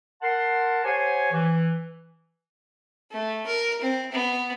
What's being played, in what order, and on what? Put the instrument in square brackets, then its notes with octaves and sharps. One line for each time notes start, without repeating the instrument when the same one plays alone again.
[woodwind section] A#4 F#5 A5 C6
G4 C5 C#5 F#5 G#5
E3
[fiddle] A3
A#4
C4
B3